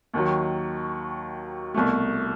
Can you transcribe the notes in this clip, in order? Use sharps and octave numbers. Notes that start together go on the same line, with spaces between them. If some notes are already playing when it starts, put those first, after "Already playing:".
D#2 D#3 F#3
C2 B2 A3